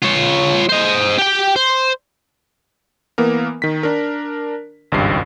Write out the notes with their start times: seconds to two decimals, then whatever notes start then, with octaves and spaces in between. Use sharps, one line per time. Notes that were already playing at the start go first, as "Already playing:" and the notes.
0.02 F4 C#5
0.69 C5 D#5
1.18 G4 G5
1.56 C5
3.18 E3 A#3 B3 A#4
3.62 D#3 B6
3.83 D4 A#4
4.92 G#1 C#2 G2 C7